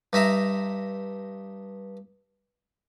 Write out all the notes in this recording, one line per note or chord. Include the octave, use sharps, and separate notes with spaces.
G2 D#4 E5 A#5